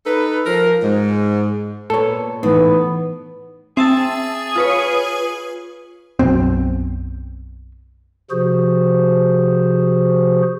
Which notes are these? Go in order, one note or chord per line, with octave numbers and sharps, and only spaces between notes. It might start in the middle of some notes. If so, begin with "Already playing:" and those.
D#4 A4 B4
F3 A#4
G#2
A#2 B3 A4 C#5
A2 E3 B3 D#4
C4 G#4 E5 A5 A6
F4 B4 C#5
B1 F#2 B2 C4
C3 F3 F#4 G#4 C5